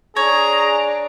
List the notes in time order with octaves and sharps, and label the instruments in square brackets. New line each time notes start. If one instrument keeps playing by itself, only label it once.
[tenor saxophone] D4 [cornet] G#4 [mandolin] C#5 [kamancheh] A#5